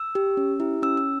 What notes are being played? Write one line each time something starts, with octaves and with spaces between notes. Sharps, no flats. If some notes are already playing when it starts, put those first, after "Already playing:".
Already playing: E6
G4
C#4
E4 G4
C#4 E6
E6